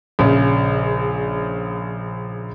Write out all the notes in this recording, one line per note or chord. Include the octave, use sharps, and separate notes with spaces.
A#1 C#3